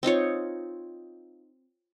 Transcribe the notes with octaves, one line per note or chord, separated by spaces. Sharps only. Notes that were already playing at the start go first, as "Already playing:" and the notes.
C4 D#4 F4 C#5